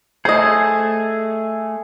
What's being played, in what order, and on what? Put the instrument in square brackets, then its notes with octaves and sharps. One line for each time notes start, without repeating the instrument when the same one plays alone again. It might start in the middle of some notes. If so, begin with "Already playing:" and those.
[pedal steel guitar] A3 G#4 [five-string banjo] C5 D#5